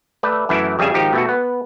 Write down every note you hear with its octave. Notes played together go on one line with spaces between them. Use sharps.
A3 B4 D5 E5
F#2 E3 A3 E4
F2 C#3 G3 G#4 E5 G#5
G#1 F3 D#4 G4
B2 A3 F#4
B3